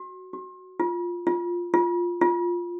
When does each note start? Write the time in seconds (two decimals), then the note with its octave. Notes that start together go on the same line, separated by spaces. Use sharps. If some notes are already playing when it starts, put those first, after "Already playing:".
Already playing: F#4
0.33 F#4
0.80 F4
1.27 F4
1.74 F4
2.21 F4